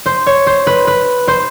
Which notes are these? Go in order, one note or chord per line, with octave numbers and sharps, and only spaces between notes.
C5
C#5
C5
B4
B4
C5